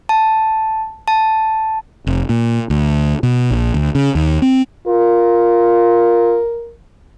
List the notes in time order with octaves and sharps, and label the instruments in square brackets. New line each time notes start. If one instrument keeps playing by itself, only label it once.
[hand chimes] A5
A5
[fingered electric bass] F1
A#2
D2
B2
A#1
D2
C#3
D#2
C4
[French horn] F4 [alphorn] A#4